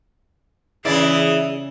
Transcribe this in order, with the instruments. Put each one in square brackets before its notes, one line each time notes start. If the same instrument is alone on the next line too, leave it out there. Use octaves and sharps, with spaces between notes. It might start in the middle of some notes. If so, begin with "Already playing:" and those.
[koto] C#3 D5 [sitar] E3 E4 [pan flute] G#4